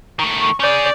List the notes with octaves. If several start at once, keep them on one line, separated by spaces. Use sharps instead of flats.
D#3 A3 C#6
C#4 G#4 D5 G6